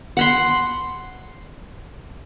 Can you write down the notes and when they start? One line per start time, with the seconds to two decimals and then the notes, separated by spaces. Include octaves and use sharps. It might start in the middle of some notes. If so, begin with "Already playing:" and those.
0.17 F#5 B5 C6